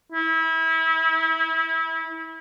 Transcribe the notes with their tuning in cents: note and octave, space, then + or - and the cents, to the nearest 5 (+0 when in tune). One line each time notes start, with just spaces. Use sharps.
E4 -25